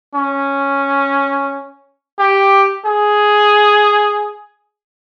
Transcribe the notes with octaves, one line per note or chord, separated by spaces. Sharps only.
C#4
G4
G#4